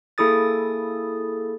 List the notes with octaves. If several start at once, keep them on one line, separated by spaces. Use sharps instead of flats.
A#3 E4 G#4 A4 D#6 A6